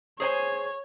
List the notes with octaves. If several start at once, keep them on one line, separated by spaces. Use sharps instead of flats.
G#4 C5 C#5 G#5